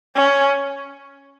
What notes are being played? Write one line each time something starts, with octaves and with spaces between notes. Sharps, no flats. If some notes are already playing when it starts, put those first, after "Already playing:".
C#4